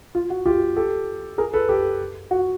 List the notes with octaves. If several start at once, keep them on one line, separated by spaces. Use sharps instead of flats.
F4
F#4
F4 G4
G4 A4
G#4 A#4
A4 B4
G4 A4
F#4